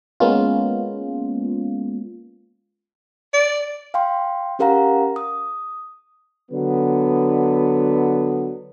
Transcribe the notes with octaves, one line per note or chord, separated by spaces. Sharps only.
G#3 A#3 B3 C#4 F4
D5
F5 G5 C6
C#4 G4 A#4 F5 F#5 A#5
D#6
D3 F#3 B3